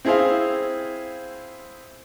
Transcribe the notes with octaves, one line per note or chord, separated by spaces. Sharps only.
C4 E4 G#4 C5 F5